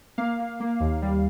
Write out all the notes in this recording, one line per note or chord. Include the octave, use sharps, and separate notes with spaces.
A#3 F5
A#3
A#3
D#2
G3